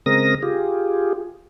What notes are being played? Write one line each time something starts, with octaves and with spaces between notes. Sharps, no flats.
C#3 G#3 C4 A#4 D#6 A#6
F4 G4 G#4